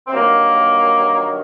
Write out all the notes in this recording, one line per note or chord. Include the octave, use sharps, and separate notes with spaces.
C4
G2 D#3 F#3 A#3